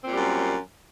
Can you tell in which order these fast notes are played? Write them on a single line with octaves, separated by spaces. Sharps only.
C4 A#2 G3 F#2